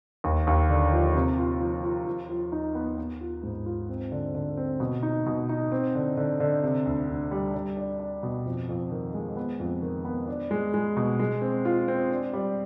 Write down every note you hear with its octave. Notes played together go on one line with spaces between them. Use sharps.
D#2
D#2
D3
F3
C3
F4
F3
F4
F3
F3
D#4
B3
B3
F4
G#2
F4
C4
D3
D3
C4
B2
D#4
B2
D#4
C4
D3
D3
D3
C3
D2
D2
G3
G3
D4
D4
B2
F2
F2
D#3
G#3
B3
F2
D#3
B3
D4
G#3
G#3
B2
G#3
C4
F4
C4
D4
G3